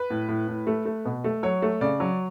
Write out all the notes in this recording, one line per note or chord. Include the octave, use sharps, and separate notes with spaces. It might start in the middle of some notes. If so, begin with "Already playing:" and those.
Already playing: B4
A2
A2
A2
A3
A3
B2
A3
F#3 C#5
A3
C#3 D5
F#3